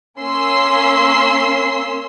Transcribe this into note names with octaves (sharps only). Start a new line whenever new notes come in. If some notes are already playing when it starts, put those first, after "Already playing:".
A#3 C#4 C6 E6 C7